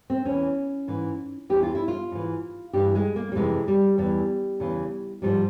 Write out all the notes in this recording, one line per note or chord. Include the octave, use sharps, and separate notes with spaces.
C4
E2 E3 C#4
G#2 E3
E2 E3 G4
F4
E4
F4
G#2 E3
G2 E3 G4
G#3
A#3
G3
F2 C3 E3 G#3
G3
E2 E3 G3
E2 C#3 E3
G#2 F3 G3